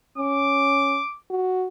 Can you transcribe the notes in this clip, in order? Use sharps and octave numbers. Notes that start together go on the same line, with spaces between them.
C#4 D6
F#4